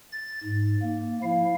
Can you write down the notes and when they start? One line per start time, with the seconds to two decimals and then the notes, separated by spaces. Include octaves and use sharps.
0.12 A6
0.44 G#2
0.82 A#3
1.23 F3 E4 F5